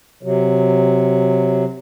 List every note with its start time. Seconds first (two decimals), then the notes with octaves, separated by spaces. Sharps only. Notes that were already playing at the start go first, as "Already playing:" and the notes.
0.23 C3 F#3